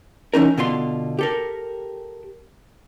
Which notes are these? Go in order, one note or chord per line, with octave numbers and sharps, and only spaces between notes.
E3 C#4 D#4 A#4
B2 D3 F4 C6
G4 A4 A#4